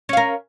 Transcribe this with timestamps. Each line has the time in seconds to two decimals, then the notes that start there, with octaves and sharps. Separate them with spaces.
0.09 C#4
0.13 F5
0.17 A#4